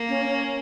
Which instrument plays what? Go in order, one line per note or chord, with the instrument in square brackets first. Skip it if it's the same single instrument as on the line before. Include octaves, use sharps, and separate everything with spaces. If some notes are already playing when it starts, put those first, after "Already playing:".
Already playing: [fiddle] A#3
[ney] C#4
C#4